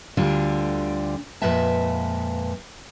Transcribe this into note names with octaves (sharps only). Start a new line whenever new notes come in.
D2 D3 G3 D4 F4
F2 A#2 G#3 B4 E5 A5